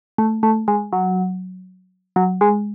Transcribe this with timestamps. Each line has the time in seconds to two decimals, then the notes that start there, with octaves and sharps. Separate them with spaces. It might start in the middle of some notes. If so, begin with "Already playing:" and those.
0.18 A3
0.43 A3
0.68 G#3
0.93 F#3
2.16 F#3
2.41 G#3